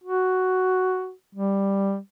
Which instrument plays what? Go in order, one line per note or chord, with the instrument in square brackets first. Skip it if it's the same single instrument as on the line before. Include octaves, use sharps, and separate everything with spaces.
[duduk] F#4
G3